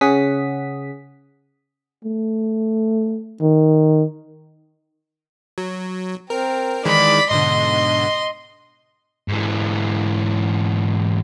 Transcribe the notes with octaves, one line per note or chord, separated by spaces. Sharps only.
C#3 C#4 G#4 F#5 D#6 B6
A3
D#3
F#3
C4 A#4
D#3 E3 G#3 D5 B5
G#2 B2 D3 D#5 C6
G#2 E3